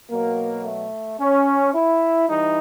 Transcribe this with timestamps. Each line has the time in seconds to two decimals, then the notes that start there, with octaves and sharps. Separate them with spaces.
0.11 B2 F#3 A#3
0.65 A3
1.21 C#4
1.75 E4
2.29 E3 G3 D#4